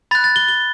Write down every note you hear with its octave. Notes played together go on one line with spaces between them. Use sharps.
B5 F#6 A6
A6
G7
G7